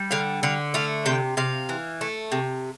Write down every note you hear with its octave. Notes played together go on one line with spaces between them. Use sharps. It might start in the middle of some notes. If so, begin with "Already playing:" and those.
Already playing: G3
D3 F5
D3 F5
A3 F5
C3 G5
C3 F5
E3
A3
C3